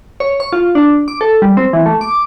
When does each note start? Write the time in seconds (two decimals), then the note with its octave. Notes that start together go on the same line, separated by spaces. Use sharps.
0.20 C#5
0.40 C#6
0.53 F4
0.75 D4
1.08 D6
1.21 A4
1.42 G3
1.57 C4
1.73 E3
1.86 A3
2.01 D6